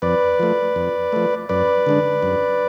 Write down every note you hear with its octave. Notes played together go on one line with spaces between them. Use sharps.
F2 B4 D5
F3 A3
F2
F3 A3
F#2 B4 D5
D3 G#3 D4
F#2